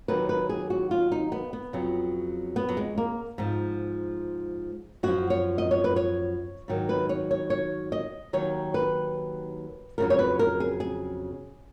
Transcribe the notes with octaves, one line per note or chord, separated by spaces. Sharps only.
D#2 D#3 F#3 B4
B4
G#4
F#4
F4
D#4
B3
B3
F2 C#3 F#3
B3
F#3
G#3
A#3
G#2 F3
F#2 F3 F#4
C#5
D#5
C#5
B4
C#5
G#2 D#3 F#3
B4
C#5
C#5
C#5
D#5
D#2 D#3 F#3 C#5
B4
F2 C#3 F#3 A#4
C#5
B4
A#4
G#4
G#4